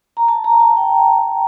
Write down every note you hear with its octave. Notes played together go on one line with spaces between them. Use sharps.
A#5
A5
A#5
A5
G5